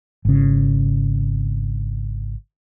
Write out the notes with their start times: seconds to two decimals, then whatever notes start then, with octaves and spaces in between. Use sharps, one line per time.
0.25 G#1 C#3